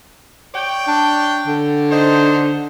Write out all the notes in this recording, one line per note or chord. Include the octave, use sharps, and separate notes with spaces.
C#5 D5 G5
D4
D3
D4 D#4 C5